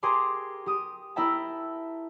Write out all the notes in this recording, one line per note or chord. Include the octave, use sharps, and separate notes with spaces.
G4 G#4 A#4 C6 D6
G4 D#6
E4 A#4 E5 G5 A5